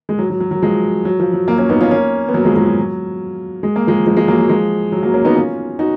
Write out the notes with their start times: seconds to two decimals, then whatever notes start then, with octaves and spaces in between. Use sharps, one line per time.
0.09 G#3
0.19 F#3
0.30 F#3
0.40 F#3
0.51 F#3
0.62 F3 G#3
1.05 F#3
1.20 F3
1.33 F#3
1.48 F#3 A#3
1.58 A#3 C#4
1.69 B3 D#4
1.81 C#4 F4
1.91 A#3 C#4
2.28 B3
2.34 F#3 A#3
2.45 F3 G#3
2.55 F3 G#3
2.66 F#3
3.63 G#3
3.76 A#3
3.87 F3 G#3
4.06 F3 G#3
4.17 F3 G#3
4.28 F#3 A#3
4.38 F#3
4.49 F3 G#3
4.92 F#3
5.03 F#3 A#3
5.14 A#3 C#4
5.25 B3 D#4
5.35 C#4 F4
5.79 D#4 F#4